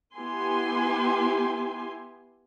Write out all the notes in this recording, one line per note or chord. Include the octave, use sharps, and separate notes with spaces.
B3 E4 G4 G#5 C6